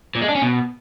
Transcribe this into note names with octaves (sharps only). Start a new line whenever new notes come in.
A#2
G#3
D4
C#4
B2